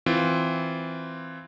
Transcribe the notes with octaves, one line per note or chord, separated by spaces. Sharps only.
E3 C4 F4